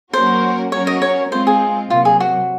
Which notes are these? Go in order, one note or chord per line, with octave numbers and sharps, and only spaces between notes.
F#3 A#3 C#4 F#4 A#4 C5
F#3 C#4 F#4 A#4 C#5
D#5
C#5
G#3 C4 F4 C5
G#4
C3 F#3 A#3 F4
G#4
F#4